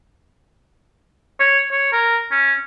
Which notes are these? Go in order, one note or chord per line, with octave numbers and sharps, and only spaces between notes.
C#5
C#5
A#4
C#4